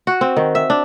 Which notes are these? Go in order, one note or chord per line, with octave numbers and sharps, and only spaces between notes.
F#4
C4
D#3
E5
D4